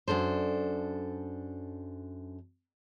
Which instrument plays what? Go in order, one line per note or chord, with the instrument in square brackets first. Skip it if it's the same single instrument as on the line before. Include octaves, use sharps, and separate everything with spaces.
[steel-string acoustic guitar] F#2 D4 A4 C5